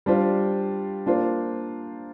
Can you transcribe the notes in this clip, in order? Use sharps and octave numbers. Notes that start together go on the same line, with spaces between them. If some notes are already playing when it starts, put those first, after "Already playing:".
G3 D4 F4 C5
A#3 D4 F4 C5